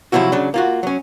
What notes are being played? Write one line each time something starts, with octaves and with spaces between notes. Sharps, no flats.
C3 F3 F#3 E4 F#4
C#3 F#3 D4
A#3 F4 F#4
F#3 C#4